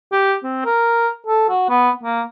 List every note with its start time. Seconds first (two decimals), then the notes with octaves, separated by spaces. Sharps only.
0.12 G4
0.43 C4
0.65 A#4
1.27 A4
1.49 F#4
1.69 B3
2.03 A#3